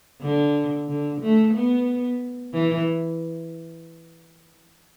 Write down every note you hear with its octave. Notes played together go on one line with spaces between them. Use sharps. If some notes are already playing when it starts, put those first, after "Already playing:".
D3
D3
A3
B3
E3